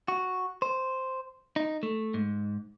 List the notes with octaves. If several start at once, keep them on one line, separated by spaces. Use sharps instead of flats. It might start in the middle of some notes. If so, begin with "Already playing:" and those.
F#4
C5
D#4
A3
G#2